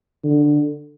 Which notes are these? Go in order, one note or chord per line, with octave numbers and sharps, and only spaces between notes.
D3